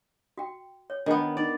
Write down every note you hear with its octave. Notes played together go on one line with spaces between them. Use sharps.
F#4 G5
C#5
D#3 B3 D4 G#4
D#4 D5